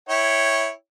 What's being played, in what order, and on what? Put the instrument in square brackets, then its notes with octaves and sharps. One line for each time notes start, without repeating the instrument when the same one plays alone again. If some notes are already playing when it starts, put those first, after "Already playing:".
[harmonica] E4 C#5 G5